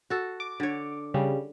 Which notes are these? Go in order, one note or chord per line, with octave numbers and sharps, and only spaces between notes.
F#4 A4
D6
D3 C#5
C#3 G3